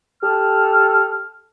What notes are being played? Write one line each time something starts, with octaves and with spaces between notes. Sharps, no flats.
G4 A4 F6